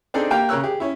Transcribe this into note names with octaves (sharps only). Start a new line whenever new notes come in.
C4 D4 D#4 G#4 A4 C5
A#3 G4 F5 G5
C#3 A#4 C#5 E6 F#6
G4 G#4
C#4 E4